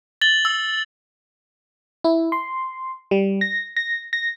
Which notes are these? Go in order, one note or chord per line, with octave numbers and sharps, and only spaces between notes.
A6 F#7 G7
E6
E4
C6
G3
A#6
A#6
A#6